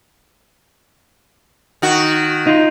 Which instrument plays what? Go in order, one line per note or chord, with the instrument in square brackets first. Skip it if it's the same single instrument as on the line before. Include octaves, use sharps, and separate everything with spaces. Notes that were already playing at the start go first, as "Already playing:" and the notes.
[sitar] D#3 F#4
[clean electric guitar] D#4 F4